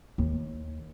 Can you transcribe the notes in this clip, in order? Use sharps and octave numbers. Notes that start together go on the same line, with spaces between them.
D#2